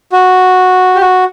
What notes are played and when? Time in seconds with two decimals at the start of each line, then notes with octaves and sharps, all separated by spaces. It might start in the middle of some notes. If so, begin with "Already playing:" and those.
0.12 F#4
0.95 G4
1.01 F#4